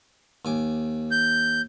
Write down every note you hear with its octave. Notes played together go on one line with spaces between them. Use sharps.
D#2 G#5 D6
G6